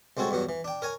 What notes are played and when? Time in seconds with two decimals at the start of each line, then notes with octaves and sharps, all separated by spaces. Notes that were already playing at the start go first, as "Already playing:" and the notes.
0.17 C2 G#3 C4 F#4 A4 C#5
0.31 E2 G2 F#3 F#5
0.49 E3
0.64 D4 G5
0.82 A#4 C#5 G#5